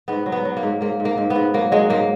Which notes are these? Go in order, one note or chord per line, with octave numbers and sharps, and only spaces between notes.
G#2 B3
F#3
B3
F#3
A#3
G#2
G#2 A#3
G#2
A#3
G#2
B3
G#2
F#3 A#3
F#3 G#3
G#2 A#3